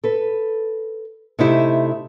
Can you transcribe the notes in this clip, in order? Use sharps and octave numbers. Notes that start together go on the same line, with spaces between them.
A4 B4
C3 A3 D#4 E4 G4